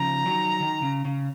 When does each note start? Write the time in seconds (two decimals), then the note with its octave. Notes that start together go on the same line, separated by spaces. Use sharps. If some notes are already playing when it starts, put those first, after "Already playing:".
Already playing: C#3 F3 A#5
0.26 D#3 F#3
0.60 D#3
0.82 C#3
1.05 C#3